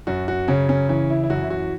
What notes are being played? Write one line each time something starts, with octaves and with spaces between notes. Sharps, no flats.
F#2 F#4
F#4
C#3 C#4
C#4
E3 C#4
E4
E4
F#2 F#4
E4
F#4